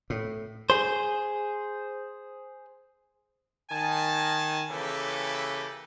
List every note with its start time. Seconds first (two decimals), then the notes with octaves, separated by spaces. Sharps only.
0.10 A2
0.70 G#4 C5
3.71 D#3 G#5 A5
4.71 C#3 E3 A#3 G4 A4 B4